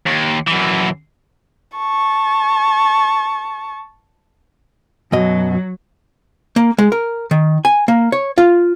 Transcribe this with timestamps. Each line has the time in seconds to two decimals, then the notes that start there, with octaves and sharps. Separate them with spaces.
0.07 D#2
0.48 F#2 E3
1.77 A5 C#6
5.12 F#2 B2 F#3 D#5
6.56 A#3
6.78 G#3
6.92 A#4
7.31 D#3
7.65 G#5
7.88 A#3
8.12 C#5
8.38 F4